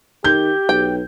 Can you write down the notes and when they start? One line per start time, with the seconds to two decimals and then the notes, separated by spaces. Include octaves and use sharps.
0.24 D#3 G4 G6
0.69 B1 G5